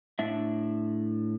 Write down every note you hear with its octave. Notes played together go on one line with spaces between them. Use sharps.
A2 D4 E5